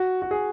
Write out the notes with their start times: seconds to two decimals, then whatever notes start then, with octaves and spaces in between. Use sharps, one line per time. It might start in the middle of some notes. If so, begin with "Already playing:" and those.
Already playing: F#4
0.22 F#4
0.31 G#4